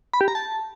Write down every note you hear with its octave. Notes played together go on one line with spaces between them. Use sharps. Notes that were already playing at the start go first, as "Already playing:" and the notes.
B5
G4
A#5
A5